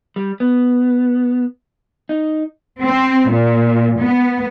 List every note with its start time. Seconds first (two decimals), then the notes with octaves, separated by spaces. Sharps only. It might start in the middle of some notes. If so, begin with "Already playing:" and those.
0.16 G3
0.40 B3
2.09 D#4
2.85 C4
3.31 A#2
4.01 B3